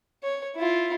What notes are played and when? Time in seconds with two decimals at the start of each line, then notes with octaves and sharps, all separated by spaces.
0.23 C#5
0.56 E4 F4